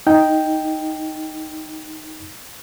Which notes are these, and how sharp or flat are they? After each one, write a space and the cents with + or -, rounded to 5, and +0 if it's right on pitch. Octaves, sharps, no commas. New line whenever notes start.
D#4 +0 G5 +0